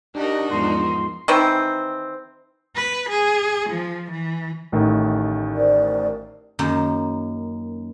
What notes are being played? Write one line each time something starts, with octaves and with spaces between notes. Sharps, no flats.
D4 D#4 F#4 G4 A#4 D#5
E2 G#2 F3 C6
D#3 E3 C4
B4
G#4
F3
E3
A1 A2 D#3
A#4 C5 D5
F#2 D#3 A#3